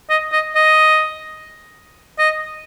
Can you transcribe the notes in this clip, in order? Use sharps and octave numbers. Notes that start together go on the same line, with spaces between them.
D#5
D#5
D#5
D#5